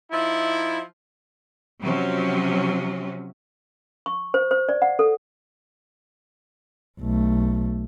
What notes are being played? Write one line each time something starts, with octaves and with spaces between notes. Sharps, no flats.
F3 D#4 E4
C3 F3 F#3 C#4
C#6
C5
C5
D5
F#5
A4
B1 A3